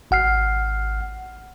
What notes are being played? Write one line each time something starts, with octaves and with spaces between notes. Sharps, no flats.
G#1 F#5 F6 C7